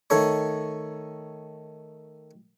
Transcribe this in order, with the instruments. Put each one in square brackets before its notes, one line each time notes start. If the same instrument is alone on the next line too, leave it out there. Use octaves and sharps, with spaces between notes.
[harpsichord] D#3 A3 C#5